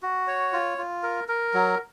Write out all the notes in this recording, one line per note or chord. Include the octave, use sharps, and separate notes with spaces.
F#4
C#5
F4
F4
A#4
A#4
F#3